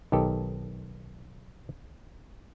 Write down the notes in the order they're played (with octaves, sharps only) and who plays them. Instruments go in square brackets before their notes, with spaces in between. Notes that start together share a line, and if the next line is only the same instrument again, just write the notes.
[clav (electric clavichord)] B1 D#3 G4 A4